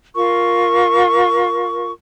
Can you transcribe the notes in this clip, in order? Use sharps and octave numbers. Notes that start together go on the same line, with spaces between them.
F4 A#4 C#6